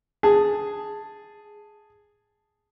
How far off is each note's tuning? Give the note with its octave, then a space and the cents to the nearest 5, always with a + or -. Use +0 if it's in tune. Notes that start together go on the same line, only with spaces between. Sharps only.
G#4 +0 A5 +0